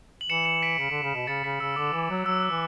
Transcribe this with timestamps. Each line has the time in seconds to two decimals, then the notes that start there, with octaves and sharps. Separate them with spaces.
0.21 F#7
0.29 E3 C#7 E7
0.45 C#7 E7
0.63 B6 D7
0.78 C#3
0.90 D3
1.03 C#3
1.15 B2
1.27 C#3 A6 C#7
1.44 C#3 B6
1.60 C#3 E6
1.76 D3 D6
1.93 E3
2.10 F#3
2.26 F#3 E6
2.43 F#6
2.51 E3